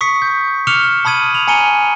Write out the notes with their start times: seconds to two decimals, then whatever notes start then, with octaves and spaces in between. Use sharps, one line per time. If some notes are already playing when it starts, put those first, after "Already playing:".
0.01 C#6 D#6 B6 C#7
0.22 G6
0.67 D6 F6 C#7 E7 F7 G7
1.05 A5 B5 D#6 G#6 D#7 F#7
1.34 F7 F#7
1.48 G#5 A#5 C#7 D#7 G7